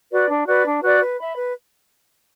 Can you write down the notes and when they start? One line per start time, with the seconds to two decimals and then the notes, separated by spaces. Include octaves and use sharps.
0.11 F#4 B4 D5
0.29 D4
0.48 F#4 B4 D5
0.65 D4
0.83 F#4 B4 D5
1.01 B4
1.19 E5 B5
1.37 B4